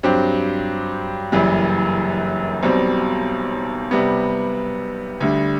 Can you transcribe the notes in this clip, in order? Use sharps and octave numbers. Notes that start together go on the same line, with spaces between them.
G2 F#3 C4 G4
F#1 F#2 E3 G3
B1 B2 G3 C4
C3 G3 B3
D2 D3 G3